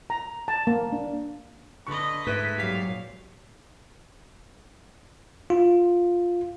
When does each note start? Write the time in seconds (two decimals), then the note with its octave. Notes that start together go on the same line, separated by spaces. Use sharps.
0.10 A#5
0.48 A5
0.67 A#3
0.93 D4
1.87 D3 B4 D#5 C#6
2.27 G#2 A3 B4 D#6 B6
2.58 A#2 F#3 G4 F5 B6
5.50 F4